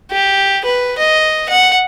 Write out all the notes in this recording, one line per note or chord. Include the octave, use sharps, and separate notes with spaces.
G4
B4
D#5
F#5